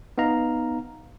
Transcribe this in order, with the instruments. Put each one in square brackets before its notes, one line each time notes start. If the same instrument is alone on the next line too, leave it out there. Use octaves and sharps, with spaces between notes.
[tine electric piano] B3 D#4 F5 A#5